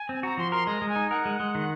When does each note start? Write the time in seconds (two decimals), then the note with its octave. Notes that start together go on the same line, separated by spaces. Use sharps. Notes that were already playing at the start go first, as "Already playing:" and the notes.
Already playing: G#5
0.09 C4
0.23 F#4 A#5
0.38 F3 C6
0.52 A#4 C6
0.67 G#3 A#5
0.82 G#3
0.89 G#5
0.96 D#4
1.10 A#4 F#5
1.25 G#3
1.40 G#3
1.55 D#3